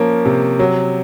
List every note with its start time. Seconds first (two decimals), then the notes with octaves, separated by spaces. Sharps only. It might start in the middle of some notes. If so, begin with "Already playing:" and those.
Already playing: F3 A#3 C#4
0.25 C3
0.59 F#3